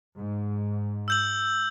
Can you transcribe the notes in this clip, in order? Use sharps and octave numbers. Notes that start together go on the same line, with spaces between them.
G#2
E6 G6 F#7